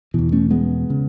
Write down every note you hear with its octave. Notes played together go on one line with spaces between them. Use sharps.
E2 B2 E3
A3 C#4
G#3 B3
C#3